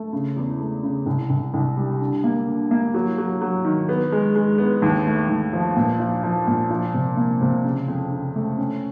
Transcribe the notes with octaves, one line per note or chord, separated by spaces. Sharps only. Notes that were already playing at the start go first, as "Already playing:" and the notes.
Already playing: A3
C#3
E2
A3
C#3
C2
C2
C2
G3
D3
A#3
D3
A#3
F#3
F#3
F#3
D#3
B3
G#3
G#3
B3
D#2
A3
D#2
F3
A#2
F3
F3
A#2
F3
C3
A#3
C3
C#3
F2
C#3
A3
C#4